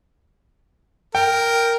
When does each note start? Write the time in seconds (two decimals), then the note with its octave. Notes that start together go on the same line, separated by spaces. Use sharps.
1.15 A#4 G5